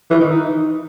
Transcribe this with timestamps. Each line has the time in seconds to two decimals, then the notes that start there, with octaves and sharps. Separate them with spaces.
0.10 E3
0.20 D#3
0.30 D#4